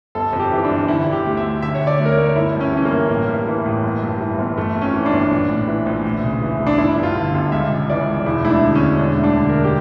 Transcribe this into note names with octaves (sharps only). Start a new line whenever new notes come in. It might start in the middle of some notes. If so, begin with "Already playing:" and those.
G1 A4
F2
G4
E3
D4
G1
D3 E4
D3
G4
D2
E5
D2
D3 E5
C#5
D3
D5
D2
A#4
C#5
D2
G1 E4
G2
C#4
E3 C#4
A#3
G1
A1
G2
E3
A1
G1
G2
E3
G1
G1 A3
F2
C#4
E3
D4
G1
A#1
A2
E3
A#1
D2
C#3
E3
D2
D4
G1 E4
G2
F4
D3
G1
C#2 E5
C#3
E3 D5
C#2
E1 E4
D2 E4
D4
D3
C#4
E1
E1 D4
D2 D4
D3
A#4
E1
G4